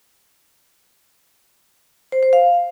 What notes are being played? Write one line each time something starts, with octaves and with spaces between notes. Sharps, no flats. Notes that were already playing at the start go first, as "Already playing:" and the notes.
C5
C5
F5